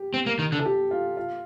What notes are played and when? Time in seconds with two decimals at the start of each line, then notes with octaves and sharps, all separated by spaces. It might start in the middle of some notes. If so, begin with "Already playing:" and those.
Already playing: G4
0.14 C4
0.26 A#3
0.39 D#3
0.52 D3
0.59 A4
0.65 G4
0.91 F4
1.17 F4